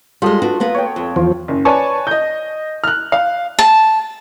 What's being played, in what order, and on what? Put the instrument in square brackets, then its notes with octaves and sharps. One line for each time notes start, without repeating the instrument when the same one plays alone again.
[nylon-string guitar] G3 G#3 [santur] F4 A4 D#6
[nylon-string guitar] D4 F#4 B4
A#3 B3 B4
[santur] C#5 G5
[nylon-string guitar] F2
[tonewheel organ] E2 F3 [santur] F4
[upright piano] F#1
B4 C#5 D5 G#5 A5 C#6
D#5 G6
F6 F#6
F5
[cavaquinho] A5